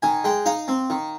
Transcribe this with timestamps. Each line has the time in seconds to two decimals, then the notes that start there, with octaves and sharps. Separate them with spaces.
0.02 D#3 G#5
0.24 G#3 G5
0.46 D#4 F5
0.68 C4
0.90 D#3